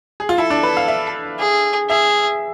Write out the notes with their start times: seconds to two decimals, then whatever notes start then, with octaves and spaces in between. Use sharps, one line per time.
0.20 G#4
0.29 F4
0.37 E4 A4
0.50 D4
0.63 B4
0.77 F5
0.88 E5
1.39 G#4
1.90 G#4 E5